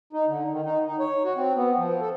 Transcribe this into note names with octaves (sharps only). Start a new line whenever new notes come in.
D#4
D3
D#3
D#4
D#4
C#5
F#4
C4
B3
F3
A4